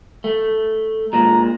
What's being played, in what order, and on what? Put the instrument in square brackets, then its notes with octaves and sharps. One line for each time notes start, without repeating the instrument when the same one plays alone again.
[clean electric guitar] A3
[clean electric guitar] A#2 G#3 [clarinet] A#5